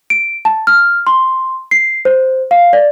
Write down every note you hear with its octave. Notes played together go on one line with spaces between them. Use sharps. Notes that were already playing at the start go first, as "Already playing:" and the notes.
D7
A5
F6
C6
C7
C5
F5
D5